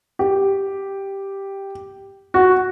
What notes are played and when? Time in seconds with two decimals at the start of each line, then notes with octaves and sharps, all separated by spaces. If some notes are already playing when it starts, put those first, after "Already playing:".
0.19 G4
2.34 F#4